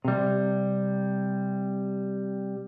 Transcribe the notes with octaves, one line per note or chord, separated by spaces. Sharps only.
C3 G3